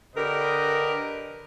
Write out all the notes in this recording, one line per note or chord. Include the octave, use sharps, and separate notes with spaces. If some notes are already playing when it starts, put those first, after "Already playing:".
D3 D4 G4 A#4 B4 D#5